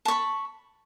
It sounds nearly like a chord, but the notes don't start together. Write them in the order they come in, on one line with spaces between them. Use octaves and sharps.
A5 C#6 B5